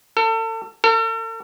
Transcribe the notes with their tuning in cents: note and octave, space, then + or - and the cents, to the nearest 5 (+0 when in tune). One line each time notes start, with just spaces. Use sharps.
A4 +35
A4 +45